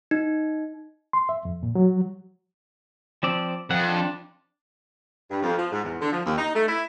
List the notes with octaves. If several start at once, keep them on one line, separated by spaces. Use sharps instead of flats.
D#4
C6
E5
F2
A#2
F#3
F3 C4 D5
F2 F#5
D4
G2
F2
F3
G#2
E2
D3
F3
D#2
D#4
A3
E4